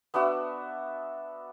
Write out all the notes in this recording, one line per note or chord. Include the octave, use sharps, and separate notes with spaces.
B3 D4 F#4 E5